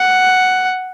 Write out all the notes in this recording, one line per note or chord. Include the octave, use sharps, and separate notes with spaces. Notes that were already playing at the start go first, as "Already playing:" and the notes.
Already playing: F#5